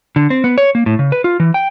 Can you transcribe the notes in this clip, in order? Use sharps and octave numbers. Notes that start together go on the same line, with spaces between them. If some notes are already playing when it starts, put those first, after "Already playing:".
D3
C4
B3
C#5
A#3
A2
C#3
B4
F4
E3
G5